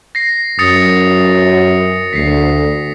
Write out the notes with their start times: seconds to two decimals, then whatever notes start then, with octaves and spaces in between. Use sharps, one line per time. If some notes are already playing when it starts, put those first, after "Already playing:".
0.15 A#6 C7
0.59 F#2 D#6 A6 C#7
2.13 D2 B6 C7